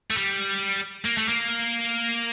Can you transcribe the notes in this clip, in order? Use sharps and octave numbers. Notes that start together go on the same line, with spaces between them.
A3
G3
A#3
A3
A#3